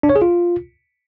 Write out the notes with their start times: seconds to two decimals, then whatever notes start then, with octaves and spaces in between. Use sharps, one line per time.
0.03 D4
0.09 C#5
0.16 G#4
0.22 F4